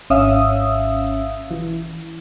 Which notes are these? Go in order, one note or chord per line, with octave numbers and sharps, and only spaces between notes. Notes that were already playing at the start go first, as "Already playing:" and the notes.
G#1 C#4 E5 F5 D#6 E6
E3